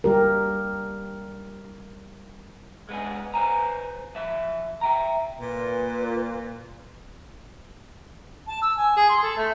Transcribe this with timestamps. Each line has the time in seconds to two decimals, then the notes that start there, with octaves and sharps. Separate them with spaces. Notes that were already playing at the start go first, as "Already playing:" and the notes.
0.04 G3 G4 A#4
2.89 G#3 B3 D4 G#4
3.34 B4 C5 G#5 A#5
4.15 F3 E5
4.81 E5 G5 A#5
5.40 A#2 B4
8.48 A5
8.62 E6
8.77 G#5
8.96 G#4
9.09 C6
9.23 A4
9.37 A3